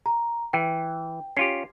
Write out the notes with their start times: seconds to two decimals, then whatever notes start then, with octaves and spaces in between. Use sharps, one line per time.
0.06 A#5
0.53 E3 G5
1.37 C#4 F4 G4 C7